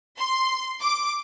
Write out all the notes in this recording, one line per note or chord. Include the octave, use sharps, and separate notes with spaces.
C6
D6